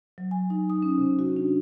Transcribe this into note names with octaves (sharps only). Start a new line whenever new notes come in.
F#3
G#5
D#4
D#6
C#4
C3
F#4
D4